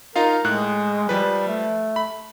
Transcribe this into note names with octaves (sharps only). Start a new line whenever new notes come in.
D#4 F4 A#4 F5
A2 G#3 F#6
F3 G3 B4
A3
B5